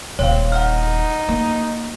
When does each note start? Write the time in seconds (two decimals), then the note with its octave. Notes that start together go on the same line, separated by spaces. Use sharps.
0.19 D#1 C4 C#5 F5
0.52 D#4 F#5 F6
1.28 A#3